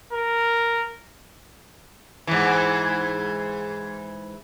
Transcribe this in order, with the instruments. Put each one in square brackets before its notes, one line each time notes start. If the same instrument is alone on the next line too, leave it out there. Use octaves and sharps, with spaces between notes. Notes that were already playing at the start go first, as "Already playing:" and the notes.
[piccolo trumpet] A#4
[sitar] G#2 E3